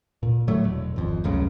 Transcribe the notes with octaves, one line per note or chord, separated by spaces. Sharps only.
A#2
A2 D3 F#3 A3
E1
G#1 F2
F1 C#2 F#2 C#3